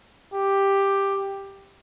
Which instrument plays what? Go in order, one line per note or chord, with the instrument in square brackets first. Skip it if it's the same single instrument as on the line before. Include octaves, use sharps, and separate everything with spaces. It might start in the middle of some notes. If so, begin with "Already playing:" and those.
[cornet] G4